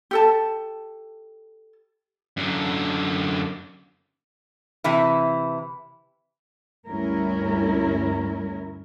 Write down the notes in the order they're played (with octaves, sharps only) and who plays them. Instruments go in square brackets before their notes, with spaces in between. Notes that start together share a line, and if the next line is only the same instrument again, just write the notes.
[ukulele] G4 A4 A5
[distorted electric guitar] F#2 D3
[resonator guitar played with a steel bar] C3 E3 E4
[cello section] D2 G2 G3 C#4 E4 A#4